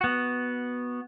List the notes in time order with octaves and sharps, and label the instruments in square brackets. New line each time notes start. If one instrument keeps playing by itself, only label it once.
[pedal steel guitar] B3 F#4